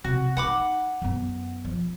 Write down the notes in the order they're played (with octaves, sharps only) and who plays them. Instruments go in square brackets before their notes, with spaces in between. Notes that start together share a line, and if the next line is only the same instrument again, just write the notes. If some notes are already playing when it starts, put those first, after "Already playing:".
[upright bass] C3 [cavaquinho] F#4
[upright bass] D#4 [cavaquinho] F#5 B5 D6
[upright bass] F#2 B3
F3